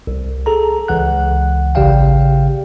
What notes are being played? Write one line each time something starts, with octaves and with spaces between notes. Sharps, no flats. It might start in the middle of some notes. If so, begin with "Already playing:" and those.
C2
G#4 A4 A#5
C#2 E3 F#5 F#6
A1 C#3 G4 D5 F5 G5